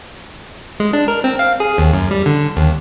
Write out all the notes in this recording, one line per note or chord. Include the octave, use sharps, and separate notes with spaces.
G#3
D4
A#4
C4
F5
G#4
D#2
F#2
G3
D3
D#2